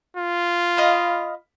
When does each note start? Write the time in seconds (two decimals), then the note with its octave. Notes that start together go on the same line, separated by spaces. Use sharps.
0.17 F4
0.77 D#5 F5 B5